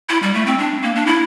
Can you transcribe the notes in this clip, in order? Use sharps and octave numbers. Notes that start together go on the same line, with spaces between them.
E4
G3
A3
C4
D4
A#3
D4
E4